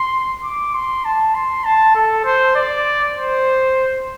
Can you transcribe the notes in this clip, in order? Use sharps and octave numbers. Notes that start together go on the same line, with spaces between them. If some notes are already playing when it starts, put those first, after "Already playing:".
Already playing: C6
D6
C6
A5
C6
A5
A4
C5
D5
C5